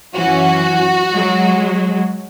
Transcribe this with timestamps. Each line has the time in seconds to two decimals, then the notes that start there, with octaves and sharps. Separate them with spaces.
0.13 F#2 E3 C#4 F#4
1.12 F#3 G#3